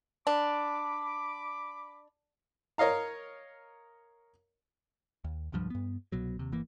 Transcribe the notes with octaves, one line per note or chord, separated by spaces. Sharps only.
D4 B5 D6
A#4 C#5 D#5 F5 A#5
D#2
D#1 C#2 G2 F3
G2 B3
C2 B2 F#3
D#2 C3
G1 E3 A#3